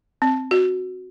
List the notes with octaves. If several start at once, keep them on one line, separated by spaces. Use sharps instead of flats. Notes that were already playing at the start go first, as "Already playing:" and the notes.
C4
F#4